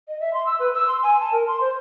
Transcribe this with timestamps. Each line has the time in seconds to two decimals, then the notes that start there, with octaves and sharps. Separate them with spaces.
0.08 D#5
0.20 E5
0.33 C6
0.46 E6
0.60 B4
0.74 E6
0.88 C6
1.03 G#5
1.20 A5
1.32 A#4
1.47 C6
1.61 C5